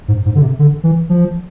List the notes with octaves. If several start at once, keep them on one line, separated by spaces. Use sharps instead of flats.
G#2
G#2
D3
C3
D3
E3
F3